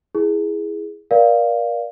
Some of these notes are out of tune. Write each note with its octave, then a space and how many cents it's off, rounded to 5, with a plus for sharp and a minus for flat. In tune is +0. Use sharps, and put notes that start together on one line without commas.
E4 +0 G#4 +0
A#4 +30 D5 +0 F5 +0